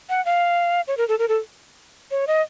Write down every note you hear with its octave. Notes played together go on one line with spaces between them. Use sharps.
F#5
F5
C#5
A#4
A4
A#4
A4
C#5
D#5